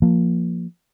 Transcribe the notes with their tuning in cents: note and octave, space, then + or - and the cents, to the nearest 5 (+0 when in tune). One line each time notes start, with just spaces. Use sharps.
F3 +0 A#3 +0